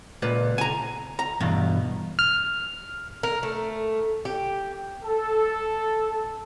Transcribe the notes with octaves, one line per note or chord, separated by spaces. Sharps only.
C#2 A#2 B4
G#5 A#5
A#5
E2 G2 B2
F6
A#4
A3
G4
A4